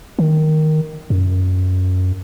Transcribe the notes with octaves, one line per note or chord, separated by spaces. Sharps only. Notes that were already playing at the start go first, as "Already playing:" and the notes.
D#3
F#2